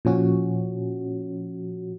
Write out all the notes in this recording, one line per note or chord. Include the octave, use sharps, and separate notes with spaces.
A#2 F3 C#4 F#4